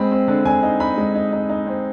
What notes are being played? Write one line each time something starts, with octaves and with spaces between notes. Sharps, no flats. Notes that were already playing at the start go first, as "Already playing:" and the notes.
Already playing: G#3 C4 B5
C4
D3
D3 G#5
D#4
D#4 B5
G#3
D#4
D#4
D#4
C4